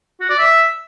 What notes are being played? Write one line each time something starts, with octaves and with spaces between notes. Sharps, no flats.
F#4
D5
E5